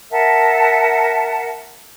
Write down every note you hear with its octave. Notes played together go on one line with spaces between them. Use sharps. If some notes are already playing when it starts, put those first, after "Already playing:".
A#4 E5 F#5 A5